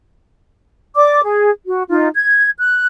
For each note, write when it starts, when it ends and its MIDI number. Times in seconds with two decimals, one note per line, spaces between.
0.95 1.20 74
0.95 1.20 86
1.22 1.49 68
1.66 1.82 66
1.88 2.07 63
1.88 2.07 65
2.14 2.49 92
2.58 2.86 90